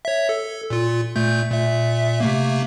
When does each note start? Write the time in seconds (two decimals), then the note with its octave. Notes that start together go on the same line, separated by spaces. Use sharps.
0.05 C#5 E5
0.29 A4
0.70 A#2 F4
1.16 A#2 A3 G6
1.51 A#2 E5
2.20 C3 A3 A#3